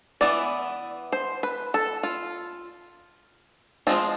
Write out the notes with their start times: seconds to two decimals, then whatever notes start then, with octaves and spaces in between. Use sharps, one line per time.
0.21 E3 B3 E4 D5
1.12 C5
1.43 B4
1.74 A4
2.03 F4
3.87 F3 G#3 C4 F4